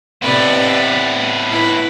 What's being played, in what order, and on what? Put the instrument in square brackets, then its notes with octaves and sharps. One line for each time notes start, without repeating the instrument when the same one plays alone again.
[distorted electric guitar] A2 B3 [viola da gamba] C3 B4 D5
[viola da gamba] E4 B4